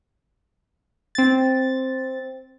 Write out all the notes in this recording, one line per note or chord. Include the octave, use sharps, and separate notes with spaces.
C4 A6